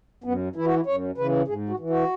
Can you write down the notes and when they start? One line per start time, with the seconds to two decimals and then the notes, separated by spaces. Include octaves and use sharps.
0.24 F#2 B3
0.56 E3 E4
0.65 F#4
0.76 E4
0.86 F#2 C#5
1.18 C#3 E3 B4
1.48 G#2 G#4
1.69 F#4
1.79 E3
1.90 F#4